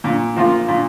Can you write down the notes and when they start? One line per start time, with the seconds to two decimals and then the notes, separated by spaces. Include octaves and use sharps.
0.04 A#2
0.36 F3 A#3 F4
0.68 A#2